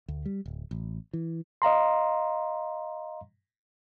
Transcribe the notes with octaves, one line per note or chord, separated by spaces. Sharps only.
D2
G3
D1
A1
E3
D#5 F5 A#5 C6